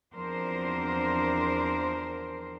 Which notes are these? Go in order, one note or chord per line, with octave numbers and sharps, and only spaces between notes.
E2 F3 C4 D4 A#4 C5